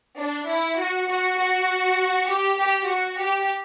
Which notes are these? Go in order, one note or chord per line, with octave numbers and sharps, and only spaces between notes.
D4
E4
F#4
F#4
F#4
G4
G4
F#4
G4